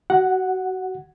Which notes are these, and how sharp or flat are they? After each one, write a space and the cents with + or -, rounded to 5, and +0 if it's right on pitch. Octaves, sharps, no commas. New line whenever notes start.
F#4 +25 F#5 +0